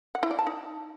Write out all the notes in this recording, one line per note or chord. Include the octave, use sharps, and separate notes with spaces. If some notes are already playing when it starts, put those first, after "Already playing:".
F#5
E4
D5
A5
D#4